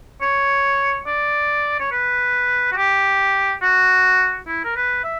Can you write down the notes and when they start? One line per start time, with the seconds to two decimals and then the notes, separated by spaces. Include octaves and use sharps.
0.22 C#5
1.07 D5
1.80 C#5
1.92 B4
2.72 F#4
2.77 G4
3.62 F#4
4.48 E4
4.65 A#4
4.76 B4
5.04 E5